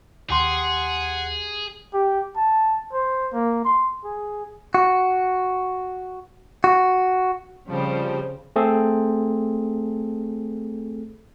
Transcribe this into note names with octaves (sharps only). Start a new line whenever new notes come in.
D#2 G4 G#4 F#5 C6
G4
A5
C5
A#3
C6
G#4
F#4
F#4
C#3 F3 G3 C4
A3 C4 G#4 A4